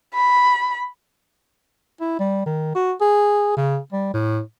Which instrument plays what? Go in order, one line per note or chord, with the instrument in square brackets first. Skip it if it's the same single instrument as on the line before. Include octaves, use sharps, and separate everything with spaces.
[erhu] B5
[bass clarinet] E4
G3
D#3
F#4
G#4
C#3
G3
A2